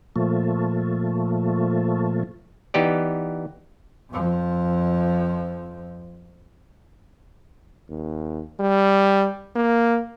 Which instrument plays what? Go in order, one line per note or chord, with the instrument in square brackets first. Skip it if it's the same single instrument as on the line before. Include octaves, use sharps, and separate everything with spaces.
[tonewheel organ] A#2 F3 A3
[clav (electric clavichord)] E3 B3 D#4 G4 D5
[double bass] F2 F3
[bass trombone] D#2
G3
A#3